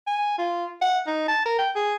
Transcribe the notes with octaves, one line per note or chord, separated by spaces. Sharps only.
G#5
F4
F#5
D#4
A5
A#4
G5
G#4